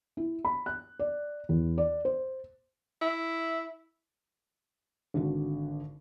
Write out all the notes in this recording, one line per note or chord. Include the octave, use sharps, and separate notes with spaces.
E4
B5
F#6
D5
E2
D5
C5
E4
G#1 D3 D4 F#4